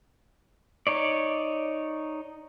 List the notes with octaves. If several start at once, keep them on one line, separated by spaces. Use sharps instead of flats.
D#4 C#5 D5